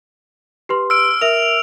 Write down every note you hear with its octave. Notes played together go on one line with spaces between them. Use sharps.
G4 B4 C6
E6 F6 D7
A#4 E5 F7